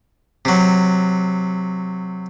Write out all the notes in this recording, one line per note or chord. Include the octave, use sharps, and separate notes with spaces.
C3 F#3